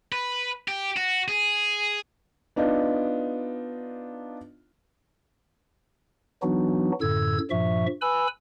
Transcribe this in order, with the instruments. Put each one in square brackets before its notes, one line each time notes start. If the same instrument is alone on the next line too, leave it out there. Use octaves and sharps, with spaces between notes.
[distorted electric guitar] B4
G4
F#4
G#4
[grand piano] B3 D4 D#4 F4
[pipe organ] E3 F#3 B3 D4 D#4 F#4
F#2 A2 D3 A4 E6 G#6
G2 A#2 F3 E5 C#6
B4 G#5 B5 E6